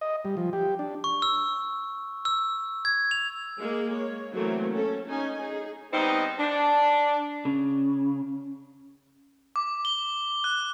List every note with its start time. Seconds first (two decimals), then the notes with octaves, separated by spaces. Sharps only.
0.01 D#5
0.25 G3
0.37 F3
0.53 G4
0.79 D4
1.04 C#6
1.22 E6
2.25 E6
2.85 G#6
3.11 F7
3.58 G#3 A#3 G#4
3.93 C#5
4.32 E3 F#3 A3 A#3 C4 A#4
4.72 C#4 A4
5.07 C#4 D#4 G#5
5.39 D#4 G#4
5.92 G3 B3 C4 D#4
6.39 D4
7.45 C#3
9.56 D6
9.85 G7
10.44 F#6